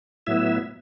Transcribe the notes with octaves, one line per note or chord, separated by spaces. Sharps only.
A2 F#3 B3 E4 E5